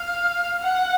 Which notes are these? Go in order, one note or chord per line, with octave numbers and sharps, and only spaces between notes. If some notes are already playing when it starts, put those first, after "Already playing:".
Already playing: F5
F#5